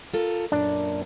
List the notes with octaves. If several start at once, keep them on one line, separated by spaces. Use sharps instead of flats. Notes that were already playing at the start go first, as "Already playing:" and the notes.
F4 A4 A#4
F#2 A#2 D4